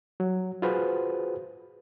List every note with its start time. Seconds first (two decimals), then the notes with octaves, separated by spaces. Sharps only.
0.20 F#3
0.62 F4 F#4 G#4 B4 C5